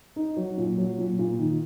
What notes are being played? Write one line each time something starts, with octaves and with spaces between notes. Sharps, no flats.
D#4
F#3
A#2
F#3
A#2
A#2
D#3